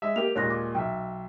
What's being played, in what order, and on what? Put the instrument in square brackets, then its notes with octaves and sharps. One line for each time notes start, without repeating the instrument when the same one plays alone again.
[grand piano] G#3 E5
[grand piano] A#3 G4 [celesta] F7
[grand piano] D#2 A#2 G#3 [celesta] C#5 F#6 A#6
[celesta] D6
[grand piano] B1 E5 [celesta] G5